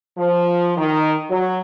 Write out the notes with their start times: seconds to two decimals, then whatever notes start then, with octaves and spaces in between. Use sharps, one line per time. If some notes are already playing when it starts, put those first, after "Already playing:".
0.18 F3
0.77 D#3
1.30 F#3